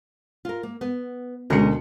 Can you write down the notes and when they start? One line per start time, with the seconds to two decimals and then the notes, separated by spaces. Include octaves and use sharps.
0.45 F4 A#4
0.63 A#3
0.81 B3
1.50 D2 B2 G#3 C#4 A#4 C#7